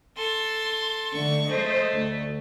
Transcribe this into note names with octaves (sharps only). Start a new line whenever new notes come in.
A4 C6
D3 A3 C#6
G#3 A3 C5 D#5
D2